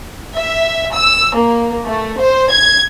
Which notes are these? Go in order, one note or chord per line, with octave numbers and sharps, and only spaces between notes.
E5
E6
A#3
A3
C5
G#6